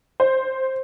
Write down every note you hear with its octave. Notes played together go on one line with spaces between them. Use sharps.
C5